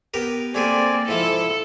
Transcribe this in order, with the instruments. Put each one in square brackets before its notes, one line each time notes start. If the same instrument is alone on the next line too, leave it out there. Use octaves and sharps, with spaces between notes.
[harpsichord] B3 G4 A#4
[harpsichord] A3 E4 G#4 [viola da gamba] A#3 [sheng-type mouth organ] C4 D5 G#5
[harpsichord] G#2 F3 [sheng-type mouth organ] E4 [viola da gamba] A4